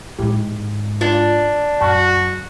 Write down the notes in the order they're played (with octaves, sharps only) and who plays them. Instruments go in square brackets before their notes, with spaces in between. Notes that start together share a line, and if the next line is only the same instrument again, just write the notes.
[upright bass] G#2 G#3 [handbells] E4 G4
[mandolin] D4 [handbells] F4
[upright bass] F#2 [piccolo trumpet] F#4 [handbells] A5 C#6 F6